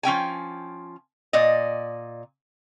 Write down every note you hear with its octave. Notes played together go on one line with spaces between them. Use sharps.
F3 C#4 G5 G#5
A#2 D5 D#5